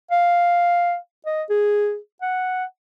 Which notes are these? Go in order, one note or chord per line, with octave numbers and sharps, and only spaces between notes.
F5
D#5
G#4
F#5